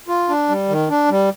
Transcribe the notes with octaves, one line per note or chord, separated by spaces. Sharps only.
F4
D4
G3
D#3
D4
G3